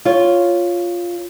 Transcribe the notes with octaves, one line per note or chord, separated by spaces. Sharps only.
F4 C#5